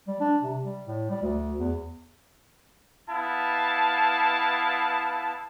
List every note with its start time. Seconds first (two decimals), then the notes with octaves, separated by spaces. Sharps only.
0.07 G3
0.20 D4
0.42 C3
0.62 G3
0.86 A2
1.10 G3
1.22 D2
1.58 E2
3.09 B3 E4 F5 A5